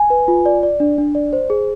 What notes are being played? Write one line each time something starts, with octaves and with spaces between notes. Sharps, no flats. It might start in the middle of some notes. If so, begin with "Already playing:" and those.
Already playing: G#5
B4
F4
D5
D5
D4
D4
D5
C5
G#4